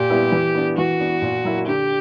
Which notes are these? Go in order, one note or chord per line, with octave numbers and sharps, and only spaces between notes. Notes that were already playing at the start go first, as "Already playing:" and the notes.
Already playing: A#2 G4
G3 B3 E4
E3
B3 D4
E3 F#4
B3 D4
A#2
F#3 A#3 E4
D3 G4